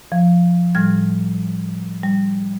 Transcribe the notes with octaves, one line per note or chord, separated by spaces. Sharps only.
F3
A2 G3 F6 G#6
G3